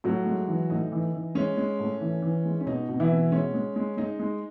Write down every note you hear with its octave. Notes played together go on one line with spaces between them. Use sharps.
A2 F#3 F#4
G#3
E3
A2 D#4
E3
E3
G#3 C#4
G#3
A2
E3
E3
G#3
C#4
B2 D#4
B2
E3 E4
B2
G#3 C#4
G#3
G#3
G#3 D#4
G#3